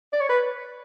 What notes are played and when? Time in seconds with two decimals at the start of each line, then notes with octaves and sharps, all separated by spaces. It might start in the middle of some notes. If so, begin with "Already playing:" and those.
0.12 D5
0.20 C#5
0.29 B4